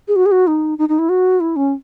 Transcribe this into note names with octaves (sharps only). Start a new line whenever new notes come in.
G#4
F#4
G#4
F#4
D#4
D#4
D#4
E4
F#4
E4
C#4